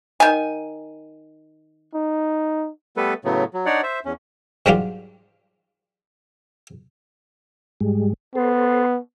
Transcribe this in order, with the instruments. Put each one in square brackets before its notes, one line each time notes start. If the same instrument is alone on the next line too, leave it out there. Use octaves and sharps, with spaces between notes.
[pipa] D#3 G#5
[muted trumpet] D#4
[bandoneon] G3 A3 B3 A4 B4
A2 C#3 F#3 A3 B3
F#3
D4 D#4 C#5 D5 F#5
C5 E5
E2 C#4
[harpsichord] G#2 F#3 G3 D4 F4 G4
[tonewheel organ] G#2 G3 G#3
[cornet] B3 [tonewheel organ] A4 C5